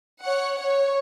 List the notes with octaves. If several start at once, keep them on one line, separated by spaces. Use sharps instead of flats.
C#5 F#5
C#5